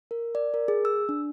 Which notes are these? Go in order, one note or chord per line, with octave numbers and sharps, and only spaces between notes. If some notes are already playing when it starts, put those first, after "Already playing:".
A#4
D5
A#4
G#4
E6
D4